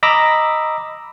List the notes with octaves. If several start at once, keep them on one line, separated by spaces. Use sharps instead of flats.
D#5 A#5 B5 D6 E6 A#6